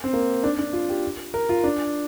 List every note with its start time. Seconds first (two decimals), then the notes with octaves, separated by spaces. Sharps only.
0.04 C4
0.13 A#3
0.43 D4
0.59 D4
0.73 F4
0.89 G4
1.34 A#4
1.49 F4
1.64 D4